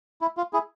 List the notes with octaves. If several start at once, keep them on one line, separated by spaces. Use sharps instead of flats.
E4
F4
E4 G#4